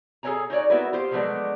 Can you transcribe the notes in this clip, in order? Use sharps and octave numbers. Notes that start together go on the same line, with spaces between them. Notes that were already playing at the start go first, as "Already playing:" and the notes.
G#4 A4 B4 C#5 G#5 A#5
D#4 F#4 C#5 D5
B3 E4 F#4 A#4 B4
F4 G4 C5
F3 F#3 G#3 A3 B3 D4